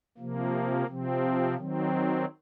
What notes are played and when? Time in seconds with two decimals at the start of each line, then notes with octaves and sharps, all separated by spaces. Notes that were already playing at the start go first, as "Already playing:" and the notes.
0.18 C3 F3 A#3
0.87 C3 F3 C4
1.56 D#3 F#3 C4